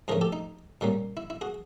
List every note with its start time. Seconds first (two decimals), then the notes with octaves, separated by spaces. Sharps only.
0.08 G#2 F3 A3 C#4 G#4 A#4
0.21 G4 A4
0.33 D#4
0.81 A#2 G3 A#3 C#4
1.17 E4
1.30 E4
1.41 F#4 G#4